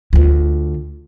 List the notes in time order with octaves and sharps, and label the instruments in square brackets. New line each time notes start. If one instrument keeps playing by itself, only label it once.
[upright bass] D2 F4